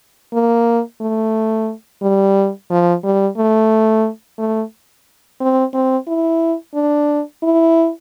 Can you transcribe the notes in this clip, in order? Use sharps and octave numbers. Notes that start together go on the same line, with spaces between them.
A#3
A3
G3
F3
G3
A3
A3
C4
C4
E4
D4
E4